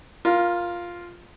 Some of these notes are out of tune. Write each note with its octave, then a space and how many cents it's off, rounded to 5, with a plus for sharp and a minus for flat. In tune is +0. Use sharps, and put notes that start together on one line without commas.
F4 +0 A#4 +20